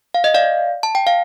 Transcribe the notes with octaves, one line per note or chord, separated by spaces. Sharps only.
F5
D#5
D5 F5
A5
G5
F5